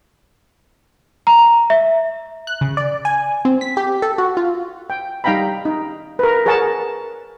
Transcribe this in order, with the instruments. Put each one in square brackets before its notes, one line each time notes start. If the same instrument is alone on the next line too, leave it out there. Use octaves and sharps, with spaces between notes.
[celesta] A#5
E5
[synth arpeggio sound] F#6
C#3
D5
G#5
C4
B6
G4
A4
F#4
F4
[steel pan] G5
G3 D#4 F5 G5 A#5 B5
D#4
A#4 B4
G#4 A#4 C#5 F#5 A5